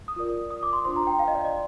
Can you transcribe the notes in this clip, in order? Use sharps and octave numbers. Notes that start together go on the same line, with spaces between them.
D#6
F4 A#4 D5
D#6
D6
C6
D4 F4 C5 C6
A#5
G5
F5
D#5
D5
D#5
D5